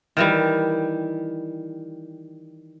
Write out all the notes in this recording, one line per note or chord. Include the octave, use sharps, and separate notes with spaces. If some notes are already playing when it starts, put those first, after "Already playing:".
D#3 E3 G3